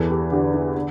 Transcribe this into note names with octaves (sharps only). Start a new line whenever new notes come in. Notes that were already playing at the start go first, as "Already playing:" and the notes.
Already playing: E2 E3 A4
G4
D3 G4
E4
D3